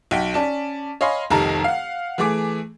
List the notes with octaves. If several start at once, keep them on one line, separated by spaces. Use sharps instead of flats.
B1 F#5 G5 B6
C#4 D5 A5
C#5 D#5 F5 G#5 B5 C6
F1 C2 D#3 A5 A#5
F5 F#5
E3 A3 G#4 D6